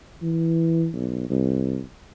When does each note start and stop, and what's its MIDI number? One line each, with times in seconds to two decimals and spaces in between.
0.22 0.88 52
0.93 1.28 35
1.30 1.80 36